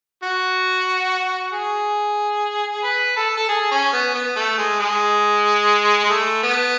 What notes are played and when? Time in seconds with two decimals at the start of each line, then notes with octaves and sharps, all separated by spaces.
0.23 F#4
1.53 G#4
2.84 B4
3.17 A4
3.37 A4
3.49 G#4
3.71 C#4
3.92 B3
4.14 B3
4.36 A3
4.58 G#3
4.80 G#3
6.04 G#3
6.10 A3
6.43 B3